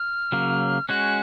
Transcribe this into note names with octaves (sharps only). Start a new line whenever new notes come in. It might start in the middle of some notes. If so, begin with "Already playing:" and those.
Already playing: F6
C#3 F#3 A#3
G#3 C#4 F#4 F#6